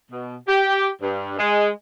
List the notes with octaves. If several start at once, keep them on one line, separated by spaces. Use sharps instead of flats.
B2
G4
G2
G#3